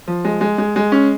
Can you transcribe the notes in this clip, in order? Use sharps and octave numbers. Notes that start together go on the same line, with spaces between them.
F3
G#3
G#3
G#3
G#3
C#4